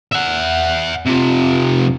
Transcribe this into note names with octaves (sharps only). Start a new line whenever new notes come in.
E5 F#5
C3 F3